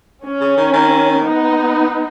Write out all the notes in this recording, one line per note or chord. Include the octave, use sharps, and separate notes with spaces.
C#4
C#3
D#3
D#3
B3 D#4